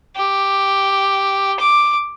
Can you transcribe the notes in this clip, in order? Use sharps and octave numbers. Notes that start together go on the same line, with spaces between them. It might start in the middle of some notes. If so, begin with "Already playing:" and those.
G4
D6